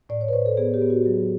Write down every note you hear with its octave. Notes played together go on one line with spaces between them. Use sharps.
A2 D5
C#5
B4
A2 C5
A4
B3 G#4
G4
B3
F#4
F#3